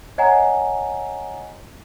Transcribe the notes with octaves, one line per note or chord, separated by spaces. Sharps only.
C#5 D#5 F#5 G#5 A#5